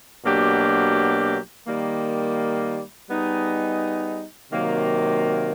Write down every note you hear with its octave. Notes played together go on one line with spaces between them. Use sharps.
B2 F#3 A#3 D4 G4
D#3 G3 A#3
G3 B3 D#4 G#4
C3 D#3 F#3 A#3